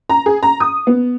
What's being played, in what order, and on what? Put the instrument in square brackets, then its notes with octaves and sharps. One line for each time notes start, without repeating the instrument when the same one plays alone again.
[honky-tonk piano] A#5
G#4
A#5
D#6
B3